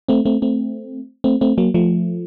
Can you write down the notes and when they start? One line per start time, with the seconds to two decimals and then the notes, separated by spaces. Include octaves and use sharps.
0.08 A3 C4
0.25 A3 C4
0.42 A3 C4
1.24 A3 C4
1.41 A3 C4
1.58 F#3 A#3
1.74 F3 A3